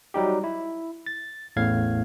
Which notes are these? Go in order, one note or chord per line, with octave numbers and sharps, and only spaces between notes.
F#3 G3 D#4 G4
E4
A6
A1 E2 A2 F5 G#6